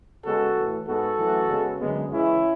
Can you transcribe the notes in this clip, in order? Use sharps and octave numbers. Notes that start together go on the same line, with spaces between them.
C#3 G#3 B3 F#4 A4
A2 E3 A3
G#2 G#3 B3 F#4 A4
F#2 E3 A3
C#3 G#3 B3
F#2 D3 G#3 B3
C#3 E3 G#3 C#4 E4